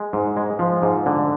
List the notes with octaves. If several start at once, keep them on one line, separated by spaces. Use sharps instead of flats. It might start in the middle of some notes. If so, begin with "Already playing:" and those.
Already playing: G#3
G#2
G#3
F3
G#2
D3